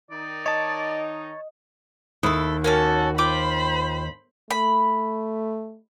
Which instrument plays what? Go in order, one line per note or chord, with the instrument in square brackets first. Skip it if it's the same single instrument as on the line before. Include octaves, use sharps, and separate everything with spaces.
[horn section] D#3 D#4 [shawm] D5
[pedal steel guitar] C#5 A5 [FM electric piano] D#5
[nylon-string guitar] D#2 [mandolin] E4 A4 [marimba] D#6
[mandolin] A#3 C#4 A4 [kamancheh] F#4 [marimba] A#4
[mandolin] F4 G5 D6 [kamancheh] C5 B5
[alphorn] A3 [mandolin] B5